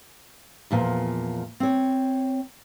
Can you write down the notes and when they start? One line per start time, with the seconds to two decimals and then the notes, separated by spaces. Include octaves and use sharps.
0.71 E2 A#2 F3
1.60 C4 C#5